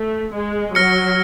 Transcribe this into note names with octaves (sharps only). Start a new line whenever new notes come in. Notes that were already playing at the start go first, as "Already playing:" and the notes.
Already playing: A3
G#3
F#3 F6 A#6 C#7